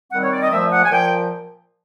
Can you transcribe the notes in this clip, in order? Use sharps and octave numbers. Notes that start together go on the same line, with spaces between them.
D#3 G3 C4 F#5
C#5
D5
D#5
A#2 F3 A3 E5
F#5
G#5
A#2 F3 G5